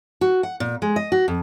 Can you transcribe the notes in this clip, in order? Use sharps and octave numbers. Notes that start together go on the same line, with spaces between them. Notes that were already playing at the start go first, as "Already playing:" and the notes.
F#4
F#5
A#2
G#3
D#5
F#4
F2